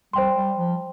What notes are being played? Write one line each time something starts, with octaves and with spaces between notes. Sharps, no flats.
G3 C5 G5 C6
G3
F3